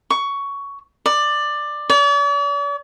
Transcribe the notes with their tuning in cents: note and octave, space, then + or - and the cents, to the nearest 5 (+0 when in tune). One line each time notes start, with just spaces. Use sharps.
C#6 +15
D5 +15
D5 -45